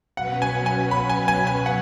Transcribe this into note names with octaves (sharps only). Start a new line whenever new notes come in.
B2 F#3 C#4 B4 F#5
G#5
G#5
B5
G#5
G#5
G#5
F#5